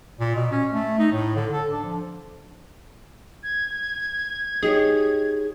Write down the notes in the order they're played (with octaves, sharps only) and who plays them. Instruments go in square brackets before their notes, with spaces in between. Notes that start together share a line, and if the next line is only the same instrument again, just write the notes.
[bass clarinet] A#2
B2
C#4
A3
D#4
A2
D3
A4
D4
F3
[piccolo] G#6
[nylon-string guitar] D#4 G4 C#5 [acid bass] G#4